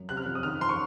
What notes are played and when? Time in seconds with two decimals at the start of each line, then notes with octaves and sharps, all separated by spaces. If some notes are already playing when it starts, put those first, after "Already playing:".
Already playing: F#2
0.09 C3 F#6
0.17 F6
0.26 F2
0.35 D#6
0.43 D#3 F6
0.61 F2 C6
0.69 C#6